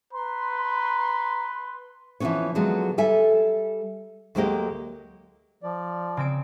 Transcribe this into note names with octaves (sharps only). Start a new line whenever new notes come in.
B4 A#5 C6
E3 F3 G3 B3 C#4 C#5
D3 F3 F#3 G#3 B3
G3 A4 E5 G#5
D2 F#3 G#3 A#3 G4 D#5
F3 D5
C#3 C4 D7